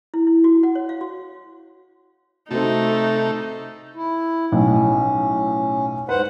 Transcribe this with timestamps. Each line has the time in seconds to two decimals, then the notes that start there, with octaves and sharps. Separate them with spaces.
0.14 E4
0.27 E4
0.44 F#4
0.63 F#5
0.75 C#5
0.89 F5
1.01 F#4
2.51 C3 A3 C4 D#4 F#4 A4
3.95 E4
4.52 B1 A2 C#4
6.09 G#2 B4 C5 F#5